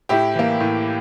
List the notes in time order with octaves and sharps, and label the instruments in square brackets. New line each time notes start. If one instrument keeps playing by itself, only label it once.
[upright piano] A2 E4 G4
E3 A#3
A2